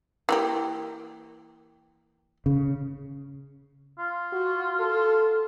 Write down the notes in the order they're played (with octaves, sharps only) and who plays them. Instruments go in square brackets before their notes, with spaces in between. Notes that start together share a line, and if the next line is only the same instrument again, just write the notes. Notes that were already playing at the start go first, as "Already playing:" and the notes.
[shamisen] E3 A#3 G4
[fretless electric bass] C#3
[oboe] F4
[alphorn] F#4
A4